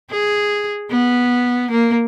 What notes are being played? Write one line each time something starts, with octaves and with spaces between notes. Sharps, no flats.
G#4
B3
A#3